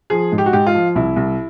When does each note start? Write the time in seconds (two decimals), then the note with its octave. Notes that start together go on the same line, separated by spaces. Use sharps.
0.10 F3 G#4
0.32 G#2
0.38 G4
0.46 F#4
0.53 G#2 G4
0.66 F4
0.75 F3
0.95 C2 E4
1.16 C2